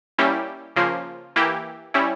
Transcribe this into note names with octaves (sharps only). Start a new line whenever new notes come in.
G3 A#3 C#4 E4 G4
C#3 F3 A#3 F4
E3 A#3 E4 G4
G3 C#4 E4